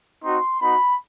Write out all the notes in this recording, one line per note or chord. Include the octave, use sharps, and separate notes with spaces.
C4 D#4 F#4 C6
B3 D#4 F#4 B5